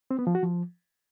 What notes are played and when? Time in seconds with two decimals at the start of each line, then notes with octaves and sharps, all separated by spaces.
0.11 C4
0.19 B3
0.27 F3
0.35 F#4
0.43 F3